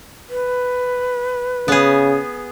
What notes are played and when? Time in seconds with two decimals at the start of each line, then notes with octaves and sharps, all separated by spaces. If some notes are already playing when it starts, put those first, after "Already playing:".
0.29 B4
1.68 C#3 B3 G#4